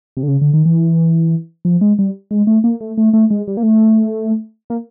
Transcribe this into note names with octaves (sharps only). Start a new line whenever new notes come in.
C3
D3
C#3
D3
D#3
E3
F3
G#3
G3
G#3
A3
A#3
A3
A3
A3
G#3
G3
A#3
A3
A#3